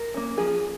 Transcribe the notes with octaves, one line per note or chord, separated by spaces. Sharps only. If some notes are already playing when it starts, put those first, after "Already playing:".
Already playing: A#4
A#3 C#4
F3 G#4